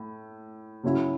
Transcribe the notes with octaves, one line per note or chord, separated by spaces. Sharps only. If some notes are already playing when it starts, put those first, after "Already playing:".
Already playing: A2
C#3 F#3 C#4 E4